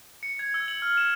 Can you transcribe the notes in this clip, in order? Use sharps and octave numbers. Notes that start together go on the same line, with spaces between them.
C#7
G#6
E6
F#7
F6
E7